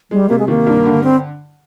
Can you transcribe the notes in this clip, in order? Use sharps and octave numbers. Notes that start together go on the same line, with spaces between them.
G3 G#3
C3 A#3
G#3
D#3 A#3
G2
D3
C4